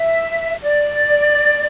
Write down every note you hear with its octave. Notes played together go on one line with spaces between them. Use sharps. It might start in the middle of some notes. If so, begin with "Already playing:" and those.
Already playing: E5
D5